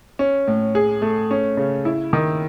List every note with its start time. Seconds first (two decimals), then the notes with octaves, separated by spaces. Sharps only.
0.19 C#4
0.47 A2
0.75 G#4
1.02 A3
1.31 C#4
1.57 C#3
1.85 E4
2.13 D#3